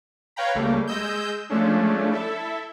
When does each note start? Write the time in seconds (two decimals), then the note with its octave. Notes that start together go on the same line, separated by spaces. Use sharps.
0.36 B4 C#5 F5 G5 A#5 B5
0.55 C#2 G3 A3 A#3
0.87 G#3 D#5 E6 G6
1.50 F3 G#3 A3 C#4 D4
2.11 E4 A4 E5